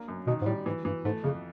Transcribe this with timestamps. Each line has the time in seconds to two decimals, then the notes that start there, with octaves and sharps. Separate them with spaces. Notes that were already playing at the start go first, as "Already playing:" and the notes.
Already playing: A#3 D4
0.08 F#2
0.27 B2 D#3
0.42 G#2
0.46 A2 G3
0.66 G#2 E3
0.85 G2 E3
1.05 G#2 A3
1.24 F2 C#3